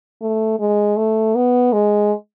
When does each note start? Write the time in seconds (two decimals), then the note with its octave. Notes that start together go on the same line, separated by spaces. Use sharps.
0.22 A3
0.60 G#3
0.97 A3
1.36 B3
1.73 G#3